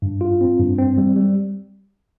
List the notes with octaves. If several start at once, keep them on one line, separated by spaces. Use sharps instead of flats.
G2
F4
C4
G2
C4
G3
G3